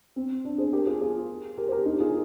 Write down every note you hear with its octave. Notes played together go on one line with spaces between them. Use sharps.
C4
D4
G#4 C5
G4 A#4
F4 G#4
F4 G#4
G4 A#4
C5
G4 A#4
D#4 G4
F4 G#4